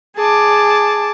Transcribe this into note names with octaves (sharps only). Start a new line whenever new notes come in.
G#4 A5 D6